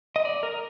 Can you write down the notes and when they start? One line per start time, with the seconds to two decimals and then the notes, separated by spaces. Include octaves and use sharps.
0.16 D#5
0.25 D5
0.43 A#4